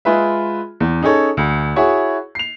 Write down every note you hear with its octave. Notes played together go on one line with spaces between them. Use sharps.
G#3 F4 G#4 B4 E5
E2
C#4 D#4 G#4 A4 C#5
D2
E4 F#4 G#4 C#5
C7 F7